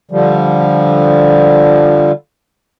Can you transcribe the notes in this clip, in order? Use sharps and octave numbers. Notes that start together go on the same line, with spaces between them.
D3 F3 G3